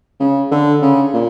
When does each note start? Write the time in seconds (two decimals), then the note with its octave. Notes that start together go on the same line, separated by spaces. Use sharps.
0.20 C#3
0.51 D3
0.82 C#3
1.14 A#2